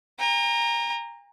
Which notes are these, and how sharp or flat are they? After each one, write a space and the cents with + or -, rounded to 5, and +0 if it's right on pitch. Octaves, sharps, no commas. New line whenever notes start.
G5 +45 A#5 +0